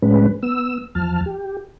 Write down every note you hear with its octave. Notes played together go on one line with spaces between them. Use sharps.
A2 G#3 C#4 B4
B3 E6
E2 F3 A5 F6
G4